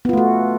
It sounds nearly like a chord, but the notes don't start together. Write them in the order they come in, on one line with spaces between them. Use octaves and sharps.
B3 F4 A3 F#4